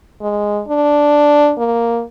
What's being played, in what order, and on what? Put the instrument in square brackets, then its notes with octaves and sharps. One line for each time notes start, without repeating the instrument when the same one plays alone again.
[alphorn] G#3
D4
A#3